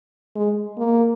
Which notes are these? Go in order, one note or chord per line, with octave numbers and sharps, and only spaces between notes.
G#3
A#3